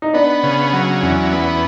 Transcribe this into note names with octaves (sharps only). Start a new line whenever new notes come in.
D#4
B3 D4
C#3
F#3
E2 C#4
B3